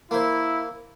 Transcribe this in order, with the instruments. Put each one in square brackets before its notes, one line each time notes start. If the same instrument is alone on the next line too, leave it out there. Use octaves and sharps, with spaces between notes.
[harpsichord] A#3 C5 [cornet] E4